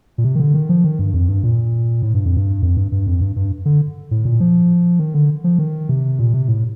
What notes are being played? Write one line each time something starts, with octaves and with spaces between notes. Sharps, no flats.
A#2
C3
D#3
D3
D#3
F3
D#3
G2
F2
G2
A#2
A2
G2
F2
G2
F2
G2
G2
F2
G2
G2
D3
A2
A#2
F3
D#3
D3
F3
D#3
C3
A#2
C3
A2